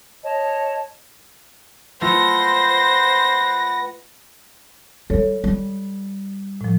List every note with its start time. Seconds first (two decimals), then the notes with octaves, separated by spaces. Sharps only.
0.25 C#5 D#5 A5
2.02 A3 F4 B4 C5 F#5 A#6
5.10 G3 A4 C#5
5.44 G3
6.61 A2 F3